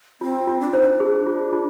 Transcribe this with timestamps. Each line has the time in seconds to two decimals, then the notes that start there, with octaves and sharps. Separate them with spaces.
0.21 C4 F4
0.47 F4
0.60 D4
0.71 D#4 C5
0.82 D#4
0.86 D4
1.00 G#4
1.26 F4
1.53 F4